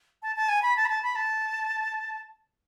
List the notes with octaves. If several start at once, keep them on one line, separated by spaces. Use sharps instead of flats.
A5
A5
G#5
B5
A5
B5
A5
B5
A5